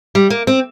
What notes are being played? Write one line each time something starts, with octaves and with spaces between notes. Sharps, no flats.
G3
A#3
C4